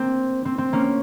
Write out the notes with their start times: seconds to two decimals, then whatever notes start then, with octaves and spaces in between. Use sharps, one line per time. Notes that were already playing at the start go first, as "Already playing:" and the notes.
Already playing: A#3 C4
0.45 C4
0.58 C4
0.73 A#3 C#4